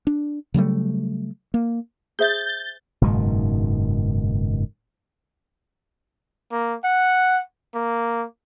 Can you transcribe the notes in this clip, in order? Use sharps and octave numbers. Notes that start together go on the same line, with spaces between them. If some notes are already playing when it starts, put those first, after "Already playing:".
D4
C#3 F#3 G3 A3
A#3
G#4 C5 E5 G6 A6
F#1 G#2 B2 D#3
A#3
F#5
A#3